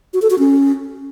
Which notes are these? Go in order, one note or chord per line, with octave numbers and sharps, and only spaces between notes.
F#4
A4
F#4
C#4